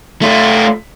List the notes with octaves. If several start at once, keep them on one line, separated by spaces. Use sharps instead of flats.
A3 F4